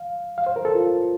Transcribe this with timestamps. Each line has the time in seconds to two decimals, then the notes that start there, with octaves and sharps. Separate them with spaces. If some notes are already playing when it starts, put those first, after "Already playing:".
Already playing: F5
0.38 F5
0.46 C5
0.56 A#4
0.65 A4
0.75 F4